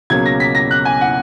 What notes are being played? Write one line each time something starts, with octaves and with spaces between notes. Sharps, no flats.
C#2 B2 F#3 A#3 C#4 G#6
A#6
B6
A#6
F#6
G#5
F#5